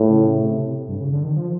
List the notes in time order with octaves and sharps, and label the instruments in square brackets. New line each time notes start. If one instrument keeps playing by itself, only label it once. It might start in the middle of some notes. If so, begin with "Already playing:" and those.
Already playing: [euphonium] A2
[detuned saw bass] C#3
C#3
C3
G2
C#3
D3
D#3
F3